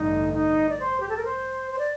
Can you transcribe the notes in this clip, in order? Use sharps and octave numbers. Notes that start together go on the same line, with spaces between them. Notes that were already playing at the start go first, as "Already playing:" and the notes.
Already playing: A1 G2 D3 D#4
D#4
D5
C5
G4
A4
A#4
C5
C5
D5